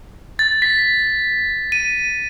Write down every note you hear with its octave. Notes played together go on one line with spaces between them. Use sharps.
A6
B6
D#7